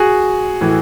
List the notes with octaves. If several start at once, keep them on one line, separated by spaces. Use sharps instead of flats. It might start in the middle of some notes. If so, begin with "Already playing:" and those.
Already playing: F#4 G#4
A2 E3